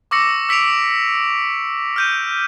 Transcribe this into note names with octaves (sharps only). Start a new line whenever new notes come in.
C#6 D6 E6 A#6 C#7
E6 B6 C#7 D7 F7
F6 G6 D#7